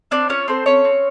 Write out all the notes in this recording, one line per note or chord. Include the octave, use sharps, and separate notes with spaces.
C4 D4 D5
C#4 F4 C#5
C4 A4 C5
C4 C#4 C#5
C4